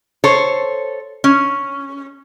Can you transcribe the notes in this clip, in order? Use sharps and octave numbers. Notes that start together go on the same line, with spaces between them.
A4 C5 C#5
C#4